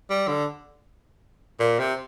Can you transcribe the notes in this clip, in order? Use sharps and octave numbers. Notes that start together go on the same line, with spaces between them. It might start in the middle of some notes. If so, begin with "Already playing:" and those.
G3
D3
A#2
C3